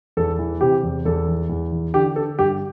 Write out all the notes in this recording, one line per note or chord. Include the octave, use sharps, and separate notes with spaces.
E2 A4
E3
C3 G4
E2
E2 A4
E3
E2
E3
D3 G4
D3 A4
G2 G4